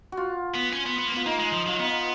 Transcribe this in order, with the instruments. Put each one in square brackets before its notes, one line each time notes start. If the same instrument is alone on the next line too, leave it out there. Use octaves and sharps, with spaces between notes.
[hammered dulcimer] F#4
F4
[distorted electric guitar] B3
C#4
B3
B3
A#3
B3
[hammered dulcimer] F4
[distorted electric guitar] A#3 [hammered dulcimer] D#4
[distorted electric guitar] G#3
F3
[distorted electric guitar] F#3 [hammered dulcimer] F4
[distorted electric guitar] B3 [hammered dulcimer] D#4